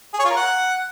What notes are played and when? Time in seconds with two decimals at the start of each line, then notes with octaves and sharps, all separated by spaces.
0.14 G#4
0.19 C#5
0.25 F4
0.30 A#4
0.36 F#5